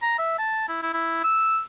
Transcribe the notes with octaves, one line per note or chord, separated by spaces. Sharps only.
A#5
E5
A5
E4
E4
E4
E6